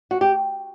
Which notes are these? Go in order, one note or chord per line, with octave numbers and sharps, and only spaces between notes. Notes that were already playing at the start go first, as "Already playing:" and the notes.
F#4
G4